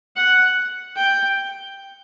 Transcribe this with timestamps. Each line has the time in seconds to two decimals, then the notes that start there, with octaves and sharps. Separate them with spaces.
0.16 F#5
0.96 G5